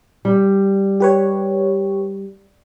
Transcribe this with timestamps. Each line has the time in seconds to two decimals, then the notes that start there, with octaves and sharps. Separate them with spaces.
0.25 G3
1.00 G4 B4 C#5